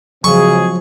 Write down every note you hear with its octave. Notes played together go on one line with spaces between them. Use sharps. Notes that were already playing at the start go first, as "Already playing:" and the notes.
C#3 F3 F#3 G#3 C4 G#4 C#6